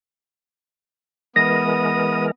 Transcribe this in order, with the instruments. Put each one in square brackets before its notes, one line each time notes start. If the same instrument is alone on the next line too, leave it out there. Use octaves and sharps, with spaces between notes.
[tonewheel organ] E3 G#3 A#4 [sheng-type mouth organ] B3 D#6 [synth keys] A#6